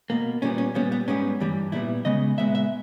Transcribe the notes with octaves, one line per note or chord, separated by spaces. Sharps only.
B2 A#3
A#2 G3 B3 C#4
C#4
A#2 G3 B3 C#4
B3
G#2 G3 B3 C#4
G2 E3 G3
A#2 G3 B3 E4
C#3 G#3 B3 D#5
A#2 G#3 B3 E5
E5